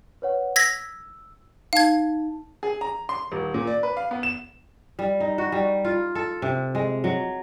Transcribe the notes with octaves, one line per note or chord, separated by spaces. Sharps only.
B4 C#5 F#5
E6 G#6 A#6 B6
D#4 F5 A5 G#6
G#4
A#5
C6
D#1
A#2
D5
B4
F5
B3
E7
G3
D#4
F#4
G3
F4
A4
C3
G#3
F#3